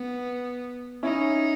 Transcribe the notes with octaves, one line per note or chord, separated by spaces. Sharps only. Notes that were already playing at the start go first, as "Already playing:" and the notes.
Already playing: B3
C#4 D#4 E4